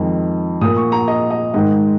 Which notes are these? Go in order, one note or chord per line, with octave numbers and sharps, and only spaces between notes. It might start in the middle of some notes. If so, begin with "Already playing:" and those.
Already playing: F2 D#3 G#3
A#2 A#3 D#6
C#6
A#5
D#5
D#5
G#2 D#3 G#3 D#5